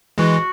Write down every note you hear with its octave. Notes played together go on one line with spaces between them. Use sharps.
E3 G#3 F#4